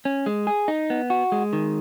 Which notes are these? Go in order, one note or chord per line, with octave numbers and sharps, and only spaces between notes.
C#4
G#3
G#4
D#4
B3
F#4
G#3
D#3